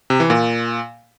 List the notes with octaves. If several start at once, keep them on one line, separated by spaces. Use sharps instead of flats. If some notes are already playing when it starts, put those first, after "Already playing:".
C3
E3
A#2